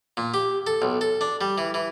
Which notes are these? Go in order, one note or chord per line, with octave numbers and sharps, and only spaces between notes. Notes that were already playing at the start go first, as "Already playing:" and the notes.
A#2
G4
A4
B1
A4
D4
G3
E3
E3